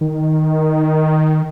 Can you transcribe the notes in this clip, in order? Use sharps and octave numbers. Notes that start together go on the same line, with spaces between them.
D#3